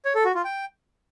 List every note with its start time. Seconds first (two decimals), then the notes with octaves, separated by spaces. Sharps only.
0.05 C#5
0.15 A4
0.25 F#4
0.35 F4
0.45 G5